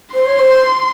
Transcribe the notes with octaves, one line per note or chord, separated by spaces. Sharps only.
C5 C6
C#5
C5